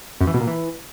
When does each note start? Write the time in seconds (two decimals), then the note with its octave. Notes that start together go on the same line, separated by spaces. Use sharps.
0.21 F#2
0.27 E3
0.34 B2
0.41 A#2
0.47 E3